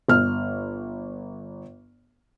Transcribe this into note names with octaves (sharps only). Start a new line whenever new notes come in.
G1 F6